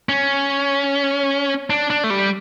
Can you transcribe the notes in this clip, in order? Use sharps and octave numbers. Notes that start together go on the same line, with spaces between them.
C#4
D4
D4
A3
G3